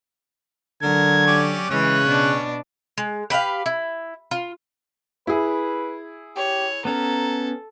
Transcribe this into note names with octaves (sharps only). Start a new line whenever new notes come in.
D3 F#3 A#4 G#6
C#4 G4 D5
C#3 E3 G#3 C#4 C#5 F#6
B2 D4
G#3
G4 B4 E5 F5
E4
F4
E4 G#4 B4
G4 C#5
B3 C#4 A4 A#5